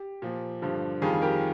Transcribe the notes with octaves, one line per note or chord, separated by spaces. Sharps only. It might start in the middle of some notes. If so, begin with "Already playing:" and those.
Already playing: G4
A#2 F3
G2 D3 F3
F2 D#3 G3 F4 G#4
G4 A#4